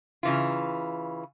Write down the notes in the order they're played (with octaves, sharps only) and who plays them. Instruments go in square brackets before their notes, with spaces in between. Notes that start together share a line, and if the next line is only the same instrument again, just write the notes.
[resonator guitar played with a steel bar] C#3 E3 F4